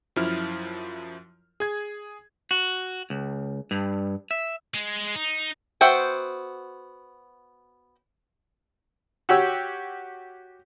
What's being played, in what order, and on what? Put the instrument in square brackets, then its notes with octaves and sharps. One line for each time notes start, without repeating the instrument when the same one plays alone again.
[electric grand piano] F#2 F3 E4 F6
G#4 G#6
[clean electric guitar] F#4
C#2
G2
E5
[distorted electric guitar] G#3
D#4
[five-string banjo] B3 F#4 C5 E5 G5
[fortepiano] F#4 G4 C#5 E6